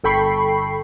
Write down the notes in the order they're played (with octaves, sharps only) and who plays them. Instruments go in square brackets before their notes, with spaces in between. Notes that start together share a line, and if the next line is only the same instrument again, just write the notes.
[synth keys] G1 A4 G5 B5 C#6 C7